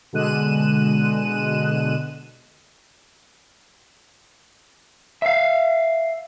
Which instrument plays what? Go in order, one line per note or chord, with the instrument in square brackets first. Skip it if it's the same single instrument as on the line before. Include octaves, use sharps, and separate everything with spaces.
[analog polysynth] B2 D3 G#3 F#6 D#7 E7
[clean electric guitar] E5 F5